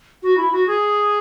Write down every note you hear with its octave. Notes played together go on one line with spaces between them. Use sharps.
F#4
E4
F#4
G#4